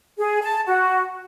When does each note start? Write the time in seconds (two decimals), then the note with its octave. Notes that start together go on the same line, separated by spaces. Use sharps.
0.18 G#4
0.42 A5
0.66 F#4